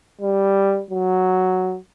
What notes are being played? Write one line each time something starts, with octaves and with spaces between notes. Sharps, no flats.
G3
F#3